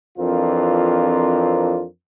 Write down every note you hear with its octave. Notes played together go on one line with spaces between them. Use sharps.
F2 E3 C4 D4 F4 A#4